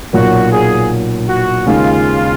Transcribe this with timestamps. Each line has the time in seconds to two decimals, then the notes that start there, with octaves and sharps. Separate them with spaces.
0.13 B1 A#2 F#3 A#3 F#4
0.51 G#4
1.28 F#4
1.66 D#2 C#3 G#3 F4